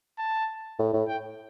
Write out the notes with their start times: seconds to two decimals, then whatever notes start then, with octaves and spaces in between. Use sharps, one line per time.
0.18 A5
0.79 A2
0.93 A2
1.08 G5